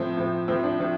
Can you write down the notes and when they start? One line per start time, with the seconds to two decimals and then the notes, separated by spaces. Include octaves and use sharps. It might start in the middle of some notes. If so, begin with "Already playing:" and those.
Already playing: A2 F3 C4
0.17 A2 F3
0.48 A2 F3 C4
0.64 D4
0.80 A2 F3